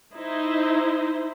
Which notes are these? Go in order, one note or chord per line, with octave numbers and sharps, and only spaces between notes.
D#4 E4 C5